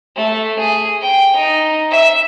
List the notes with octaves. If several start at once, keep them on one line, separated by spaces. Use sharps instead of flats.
A3
G#4
G5
D#4
E5